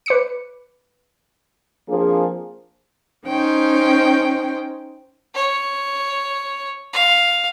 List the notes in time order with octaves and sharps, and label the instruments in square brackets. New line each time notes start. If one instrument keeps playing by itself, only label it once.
[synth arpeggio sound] B4 D6 C#7
[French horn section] F3 A#3 C4 D4 G#4
[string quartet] C#4 D#4 C5 G5
[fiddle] C#5
F5